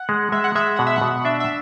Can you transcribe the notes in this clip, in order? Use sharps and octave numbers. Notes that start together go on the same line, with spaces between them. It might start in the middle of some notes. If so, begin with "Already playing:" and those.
Already playing: F#5
G#3
G#3 E5
F#5
G#3 E5
B2 F#5
E5
F#5
B2
D4 E5
E5